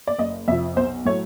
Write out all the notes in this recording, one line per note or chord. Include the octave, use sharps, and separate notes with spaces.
D5
F#1 D#5
F2 C3 F3 E5
B1 C5
A2 F#3 A3 C#5